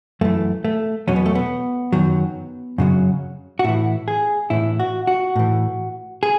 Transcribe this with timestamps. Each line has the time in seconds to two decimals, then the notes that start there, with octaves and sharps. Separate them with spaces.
0.21 F#2 E3 A3
0.65 A3
1.07 E2 B2 F#3 C#4
1.16 B3
1.26 A3
1.35 B3
1.92 F#2 D#3 F#3
2.78 F#2 C#3 F#3
3.59 F#4
3.64 A2 E3 E4
4.08 G#4
4.50 A2 E3 E4
4.80 F#4
5.07 F#4
5.36 A2 E3
6.23 G#4